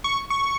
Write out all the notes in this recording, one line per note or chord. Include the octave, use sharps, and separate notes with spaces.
C#6
C#6